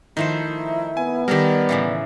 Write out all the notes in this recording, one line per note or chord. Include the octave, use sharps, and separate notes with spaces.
D#3 F3 A3 D#4 E4 C5
F3
B3 G#5
D#3 G3 G4 A4 A#4 D5
A2 C#3 E3